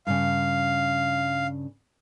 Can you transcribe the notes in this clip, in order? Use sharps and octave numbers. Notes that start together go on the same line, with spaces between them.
G2 C#3 F5